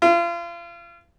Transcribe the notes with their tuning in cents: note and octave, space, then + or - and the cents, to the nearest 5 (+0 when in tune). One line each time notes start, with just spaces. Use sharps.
F4 -35